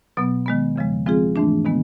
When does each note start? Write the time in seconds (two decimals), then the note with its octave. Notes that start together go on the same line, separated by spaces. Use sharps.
0.17 B2 F#3 B3
0.46 D#3 G#3 B3
0.76 E2 C#3 F3 G#3
1.06 F3 G#3 C4 F4 G#4
1.36 G#2 E3 A3 D4
1.65 C3 D#3 G#3 B3